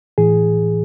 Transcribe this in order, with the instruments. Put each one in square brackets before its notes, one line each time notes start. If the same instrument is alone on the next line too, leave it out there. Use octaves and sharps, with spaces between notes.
[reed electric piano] A2 E3 G#4